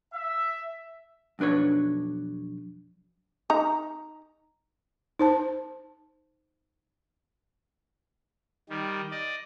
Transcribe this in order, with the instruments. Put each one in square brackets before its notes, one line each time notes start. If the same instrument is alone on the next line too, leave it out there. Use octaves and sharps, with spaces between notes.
[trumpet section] E5
[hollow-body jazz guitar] B1 F2 D4 B4 C#5
[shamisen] D#4 A#5
[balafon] D#4 C5 A5
[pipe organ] D#3 G3
D5 D#5